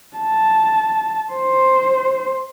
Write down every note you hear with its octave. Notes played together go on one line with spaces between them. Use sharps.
A5
C5